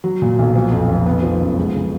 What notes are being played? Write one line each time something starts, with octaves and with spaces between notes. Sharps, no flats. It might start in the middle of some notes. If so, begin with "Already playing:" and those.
F#3
A#2
B1
F3
F2
F1
B3
F3
F#2
G#3
C#3